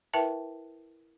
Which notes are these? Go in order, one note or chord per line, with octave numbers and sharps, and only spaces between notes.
E4 A#4 B4 E5 G5 A5